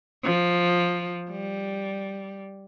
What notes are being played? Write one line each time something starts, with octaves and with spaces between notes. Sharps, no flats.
F3
G3